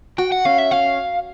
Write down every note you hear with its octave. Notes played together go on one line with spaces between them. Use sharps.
F#4 G5
F#5
C#4 F5
E5
C#4 F5